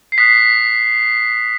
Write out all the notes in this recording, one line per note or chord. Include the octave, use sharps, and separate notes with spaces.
C7
D#6 F#6 B6